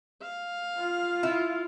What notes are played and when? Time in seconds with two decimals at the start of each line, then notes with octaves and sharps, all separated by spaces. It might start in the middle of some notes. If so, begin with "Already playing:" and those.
0.21 F5
0.77 F4
1.23 E4